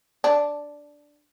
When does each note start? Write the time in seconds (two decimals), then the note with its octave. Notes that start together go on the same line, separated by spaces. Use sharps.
0.24 D4